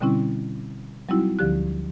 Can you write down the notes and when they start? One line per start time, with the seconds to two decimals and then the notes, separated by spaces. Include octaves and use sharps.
0.01 B2 D3 G3 C4 C#4 E4
1.09 F#3 G3 C4 D#4 E4 F#4
1.39 D2 D3 F3 G4 F#6